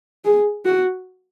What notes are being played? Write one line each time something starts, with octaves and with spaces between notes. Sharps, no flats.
G#4
F#4